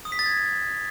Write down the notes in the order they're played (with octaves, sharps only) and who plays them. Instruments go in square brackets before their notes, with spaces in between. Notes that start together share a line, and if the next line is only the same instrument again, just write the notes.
[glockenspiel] D#6
B6
A6
G#6